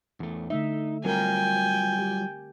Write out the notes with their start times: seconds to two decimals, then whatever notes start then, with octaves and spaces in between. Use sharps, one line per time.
0.20 E2 A3
0.50 D3 A3 D#4 E5
1.04 F#3 G3 C4 F4 A#4 G5 G#5
1.99 G4